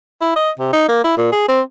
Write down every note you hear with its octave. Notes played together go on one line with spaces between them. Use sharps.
E4
D#5
C3
D#4
A#3
E4
A#2
G#4
C4